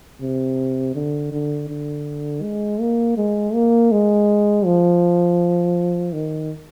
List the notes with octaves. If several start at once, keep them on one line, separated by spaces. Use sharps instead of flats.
C3
D3
D3
D3
G#3
A#3
G#3
A#3
G#3
F3
D#3